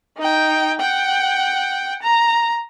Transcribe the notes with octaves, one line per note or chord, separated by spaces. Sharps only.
D#4 G5
F#5 G5
A#5